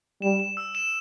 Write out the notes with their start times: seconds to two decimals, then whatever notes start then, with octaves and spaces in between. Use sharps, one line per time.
0.22 G3 E7
0.40 E7
0.57 E6
0.75 E7